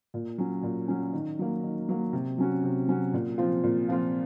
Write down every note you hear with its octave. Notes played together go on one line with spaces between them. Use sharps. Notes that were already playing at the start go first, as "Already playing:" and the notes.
A#2
F#3 C#4
A#2
F#3 C#4
D#3
F#3 A#3
D#3
F#3 A#3
C3
F#3 C#4 F#4
C3
F#3 C#4 F#4
A#2
F3 C4 F4
A#2
F3 C4 F4